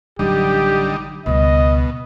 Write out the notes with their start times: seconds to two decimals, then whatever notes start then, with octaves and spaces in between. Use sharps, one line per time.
0.19 A1 D3 F#3 G3 D#4 G4
1.26 C#2 B2 G3 D#5